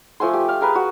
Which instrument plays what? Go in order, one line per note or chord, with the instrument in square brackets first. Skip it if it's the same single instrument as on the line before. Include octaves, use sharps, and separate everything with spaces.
[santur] F3 A3 G#5 C6
G4
F5
G#4 A#4 B4
F#4